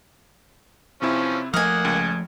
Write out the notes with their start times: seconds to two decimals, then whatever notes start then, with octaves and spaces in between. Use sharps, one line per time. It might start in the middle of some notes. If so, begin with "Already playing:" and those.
1.02 C3 E3 F3 C4 C#4 E4
1.54 F3 A3 A#3 D#5 F#5 G#5 F6
1.85 C#2